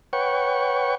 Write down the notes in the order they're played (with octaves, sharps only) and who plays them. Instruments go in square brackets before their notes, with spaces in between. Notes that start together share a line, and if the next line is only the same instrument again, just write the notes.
[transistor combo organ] B4 C#5 F#5 G5 C#6